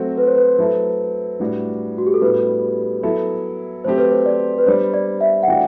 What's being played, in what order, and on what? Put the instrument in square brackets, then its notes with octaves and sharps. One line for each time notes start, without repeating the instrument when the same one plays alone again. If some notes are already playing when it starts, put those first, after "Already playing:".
Already playing: [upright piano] F#3 A3 C4 F#4 A4 [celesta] C5
[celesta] B4
C5
B4
[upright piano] F#3 A3 E4 A4
A2 G3 D4 F#4
[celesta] F#4
G4
A4
[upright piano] A2 G3 B3 D4 [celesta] B4
[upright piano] F#3 B3 E4 A4
[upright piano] F#3 A3 C4 G4 [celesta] C5
[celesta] B4
C5
D5
B4
[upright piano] G3 B3 D4 [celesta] C5
[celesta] D5
E5
F#5
[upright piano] E3 A3 D4 F#4 [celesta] G5